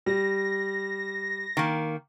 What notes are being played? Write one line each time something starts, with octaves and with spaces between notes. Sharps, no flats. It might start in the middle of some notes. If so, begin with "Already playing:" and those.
G3 A#6
D#3 A#3